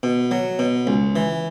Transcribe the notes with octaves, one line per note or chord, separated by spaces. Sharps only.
B2
F#3
B2
C#2
E3